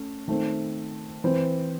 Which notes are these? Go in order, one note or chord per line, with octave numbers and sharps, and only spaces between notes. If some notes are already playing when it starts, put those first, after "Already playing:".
Already playing: A3 C#4
D#3 A3 C4
E3 C4